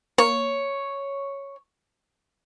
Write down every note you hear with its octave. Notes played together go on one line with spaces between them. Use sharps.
A#3 C#5